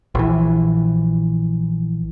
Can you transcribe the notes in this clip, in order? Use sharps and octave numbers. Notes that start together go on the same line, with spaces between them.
A#1 E3